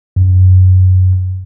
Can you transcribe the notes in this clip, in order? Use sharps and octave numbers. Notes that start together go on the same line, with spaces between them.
F#2